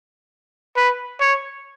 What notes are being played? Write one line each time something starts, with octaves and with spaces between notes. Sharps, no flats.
B4
C#5